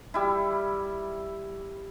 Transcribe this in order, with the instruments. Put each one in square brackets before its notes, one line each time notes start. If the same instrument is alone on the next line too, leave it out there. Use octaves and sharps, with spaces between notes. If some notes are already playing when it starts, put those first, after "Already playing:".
[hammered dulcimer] G3 E4